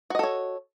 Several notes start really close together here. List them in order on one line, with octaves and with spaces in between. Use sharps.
F#4 D#5 A4 C#5